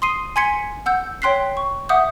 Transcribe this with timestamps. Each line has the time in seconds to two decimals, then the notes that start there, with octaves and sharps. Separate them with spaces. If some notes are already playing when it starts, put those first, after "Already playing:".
0.02 C6 D#6 C7 D#7
0.36 G#5 C6 G#6 B6 C#7
0.86 F#5 E6 G6
1.22 C#5 G5 C6 F#6 B6 C7
1.57 C#6
1.89 E5 F#5 D6 D#6 G6